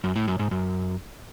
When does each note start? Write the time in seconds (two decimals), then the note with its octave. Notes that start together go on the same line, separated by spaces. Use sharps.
0.04 F#2
0.16 A2
0.28 F#2
0.39 G#2
0.51 F#2